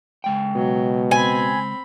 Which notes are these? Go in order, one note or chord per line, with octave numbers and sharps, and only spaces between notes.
C#3 G#3 G5
B2 F#3
C4 G#5 B5